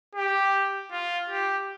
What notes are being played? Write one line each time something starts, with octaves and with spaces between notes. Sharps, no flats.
G4
F4
G4